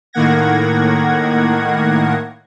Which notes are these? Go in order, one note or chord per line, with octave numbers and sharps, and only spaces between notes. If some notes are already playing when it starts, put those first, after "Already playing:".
A2 D#3 A#3 F#5 G#6 A#6